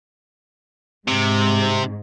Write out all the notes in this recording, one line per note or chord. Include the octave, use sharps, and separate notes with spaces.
G#2 C3